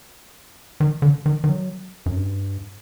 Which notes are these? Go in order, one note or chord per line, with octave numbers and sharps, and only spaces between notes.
D#3
D3
D#3
D#3
F#3
F#2
G2